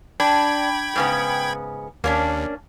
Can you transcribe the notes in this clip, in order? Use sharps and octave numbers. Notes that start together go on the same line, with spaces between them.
D4 G5 B5 G#6
G#2 C#3 B3
D#2 A#3 C#4 D4